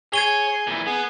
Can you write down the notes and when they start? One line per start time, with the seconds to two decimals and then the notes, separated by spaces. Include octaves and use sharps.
0.13 G#4 C#5 G#6 D#7 G7
0.67 A#2 E3
0.87 B3 G#4